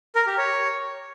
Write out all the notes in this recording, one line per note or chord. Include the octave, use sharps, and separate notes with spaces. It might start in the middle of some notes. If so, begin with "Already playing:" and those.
A#4
G4
C#5